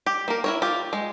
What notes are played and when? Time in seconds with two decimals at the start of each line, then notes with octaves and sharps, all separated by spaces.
0.06 G4
0.28 A#3 A#4
0.44 E4 A#4 C#5
0.62 F4 G4
0.93 G#3